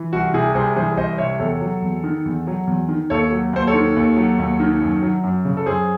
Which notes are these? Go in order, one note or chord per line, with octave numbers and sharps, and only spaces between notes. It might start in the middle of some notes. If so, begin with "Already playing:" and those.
Already playing: E3
C2 F#4
C3 E4 G#4
C2 G#4 C5
E3 G#4 C5
C2 C5 D#5
C3 C#5 E5
E2 A4 C#5
F#3
E2
D#3
E2
F#3
E2
D#3
D#2 A4 C#5
F#3
D#2 C5
A4 C#5
D#3
D#2
F#3
D#2
D#3
F#2
F#3
F#2
C#3
A4
F#2 G#4 C5